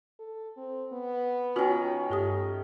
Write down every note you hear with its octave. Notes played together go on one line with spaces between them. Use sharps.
A4
C4
B3
D#3 C#4 F4 F#4 B4
G2 A3 G4 D#6